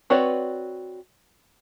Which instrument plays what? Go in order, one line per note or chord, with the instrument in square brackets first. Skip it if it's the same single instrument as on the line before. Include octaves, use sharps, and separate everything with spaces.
[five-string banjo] C4 F#4 B4 C#5 D5